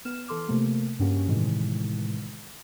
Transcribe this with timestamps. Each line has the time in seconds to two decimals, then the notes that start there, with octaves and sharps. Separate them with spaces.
0.05 B3 F6 E7
0.27 E3 A4 C6 D6 F6
0.48 C3 F3 A3 A#3
0.99 G2 C#3 A#3 C#4 F#4 G4
1.28 A2 C3 D#3 E3 G#3